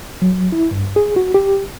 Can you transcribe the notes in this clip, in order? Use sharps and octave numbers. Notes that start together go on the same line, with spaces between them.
F#3
E4
G2
G#4
F#4
G4